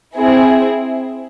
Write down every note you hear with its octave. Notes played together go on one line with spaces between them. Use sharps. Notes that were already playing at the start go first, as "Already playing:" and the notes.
C4 E4 G#4